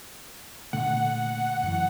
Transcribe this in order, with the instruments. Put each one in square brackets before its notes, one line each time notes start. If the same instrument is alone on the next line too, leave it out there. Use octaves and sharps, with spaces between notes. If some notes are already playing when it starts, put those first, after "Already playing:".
[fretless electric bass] A#2 D3 A3 [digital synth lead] F#5
[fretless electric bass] F#2 E3 [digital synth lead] F#5